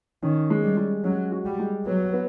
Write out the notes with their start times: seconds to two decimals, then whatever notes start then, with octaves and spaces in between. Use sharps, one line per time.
0.22 D#3 C#4
0.50 G#3
0.63 G3
0.77 G#3
1.04 F#3 C#4
1.32 F#4
1.45 G3
1.59 G#3
1.86 F#3 B3
2.13 B3